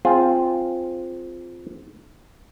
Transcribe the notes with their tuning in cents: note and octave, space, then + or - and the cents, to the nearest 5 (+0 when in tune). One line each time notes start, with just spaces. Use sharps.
C4 +0 F4 +0 G#4 +0